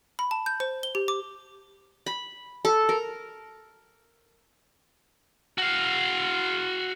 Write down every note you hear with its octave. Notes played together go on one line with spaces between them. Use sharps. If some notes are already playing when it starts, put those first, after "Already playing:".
B5
A5
G6
C5
G7
G4
D6
B5
A4
A#4
F#4 F5